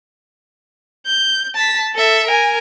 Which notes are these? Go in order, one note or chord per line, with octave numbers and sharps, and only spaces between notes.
G6
A5 B6
A4 E5
A#4 G#5